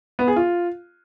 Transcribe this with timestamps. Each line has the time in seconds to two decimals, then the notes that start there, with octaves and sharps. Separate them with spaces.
0.19 B3
0.28 G#4
0.36 F4